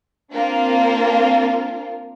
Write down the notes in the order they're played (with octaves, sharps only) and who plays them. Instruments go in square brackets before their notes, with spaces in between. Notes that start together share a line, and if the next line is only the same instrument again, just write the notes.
[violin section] A#3 C4 D4 F4 A#4